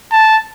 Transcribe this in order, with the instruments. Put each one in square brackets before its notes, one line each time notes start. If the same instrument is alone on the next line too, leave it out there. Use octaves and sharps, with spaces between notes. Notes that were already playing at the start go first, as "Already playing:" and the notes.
[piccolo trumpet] A5